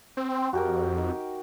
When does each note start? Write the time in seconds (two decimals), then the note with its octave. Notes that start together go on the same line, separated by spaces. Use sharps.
0.17 C4
0.53 F2 F#4 G4 A#4
0.97 D#4